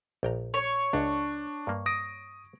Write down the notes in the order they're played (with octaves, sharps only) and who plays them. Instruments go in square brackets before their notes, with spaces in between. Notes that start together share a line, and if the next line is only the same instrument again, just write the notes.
[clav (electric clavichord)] A#1 G5 A#5
[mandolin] C#5
[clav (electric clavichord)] C#2 [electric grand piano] D4
[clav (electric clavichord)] G2 A#3
[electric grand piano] D#6 A#6 D7